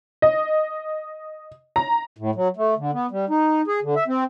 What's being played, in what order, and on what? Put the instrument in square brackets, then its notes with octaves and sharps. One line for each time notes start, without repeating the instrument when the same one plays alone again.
[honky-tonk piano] D#5
A#5
[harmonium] A2
F#3
A3
D3
B3
G3
D#4
G#4
D3
E5
C4